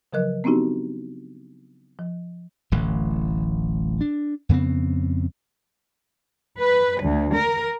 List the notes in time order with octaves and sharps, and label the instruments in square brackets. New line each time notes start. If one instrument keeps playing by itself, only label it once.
[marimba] C#3 F3 F#3 A#4 D#5 F#6
B3 C4 D4 D#4 F#4 G4
F3
[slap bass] D1 A1 E3
D4
F2 C#3 B3 C4
[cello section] B4
D2
A#4